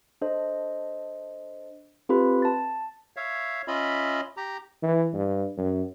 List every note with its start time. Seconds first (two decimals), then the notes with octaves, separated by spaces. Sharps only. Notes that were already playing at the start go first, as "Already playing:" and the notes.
0.21 D4 A4 C5 D#5
2.09 C4 F4 G4 A4 B4 B5
2.42 A5 A6
3.17 C#5 E5 F5
3.68 C#4 F4 D#5 E5 B5
4.37 G4 A#5
4.83 E3
5.14 G2
5.58 F#2